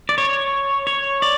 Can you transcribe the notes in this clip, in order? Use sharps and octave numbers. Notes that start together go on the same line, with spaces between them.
D5
C#5
C#5
D5